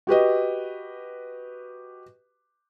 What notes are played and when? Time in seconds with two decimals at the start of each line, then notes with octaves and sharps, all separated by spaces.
0.07 F#4 G4 B4 D#5